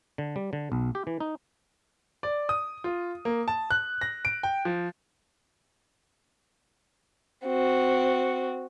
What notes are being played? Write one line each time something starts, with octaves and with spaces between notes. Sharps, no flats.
D3
G3
D3
B1
G4
E3
D#4
D5
D#6
F4
A#3
A5
F#6
A#6
D7
G5
F3
C4 F#4